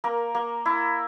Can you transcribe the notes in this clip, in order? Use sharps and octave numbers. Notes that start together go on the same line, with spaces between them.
A#3 A#4
A#3
E4